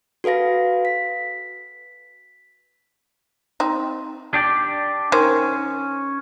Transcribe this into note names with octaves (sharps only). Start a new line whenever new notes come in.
F#4 A4 B4 F5 A#6
B6
C4 D#4
D4 G4 D5
D#3 C#4 C5